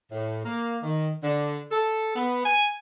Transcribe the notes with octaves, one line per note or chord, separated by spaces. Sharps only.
A2
A#3
D#3
D3
A4
B3
G#5